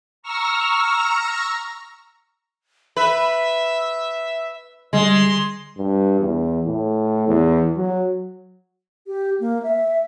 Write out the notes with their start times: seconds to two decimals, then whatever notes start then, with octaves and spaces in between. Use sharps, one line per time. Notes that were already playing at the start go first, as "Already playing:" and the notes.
0.23 A#5 C#6 E6 F6 A#6
2.97 B4 E5
4.93 D3 G3 G#3 C6
5.78 G2
6.20 E2
6.66 A2
7.28 E2
7.77 F#3
9.07 G4
9.40 A#3
9.63 E5